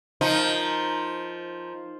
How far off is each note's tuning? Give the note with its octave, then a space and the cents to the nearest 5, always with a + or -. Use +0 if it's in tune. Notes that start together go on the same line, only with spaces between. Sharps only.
F3 +0 D#4 +0 A#4 +0